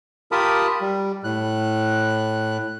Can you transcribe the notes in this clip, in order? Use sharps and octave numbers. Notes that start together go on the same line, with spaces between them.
F4 G4 A#4 A5 B5 D#6
G3
A2 F#6